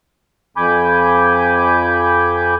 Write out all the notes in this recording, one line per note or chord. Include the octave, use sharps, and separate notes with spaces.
F2 G#5 B5 D6 G6